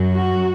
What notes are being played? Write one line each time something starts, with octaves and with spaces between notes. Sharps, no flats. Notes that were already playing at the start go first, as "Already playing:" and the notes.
Already playing: F#2 F#3
F#4